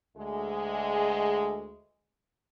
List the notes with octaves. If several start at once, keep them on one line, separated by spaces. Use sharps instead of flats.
D2 G#3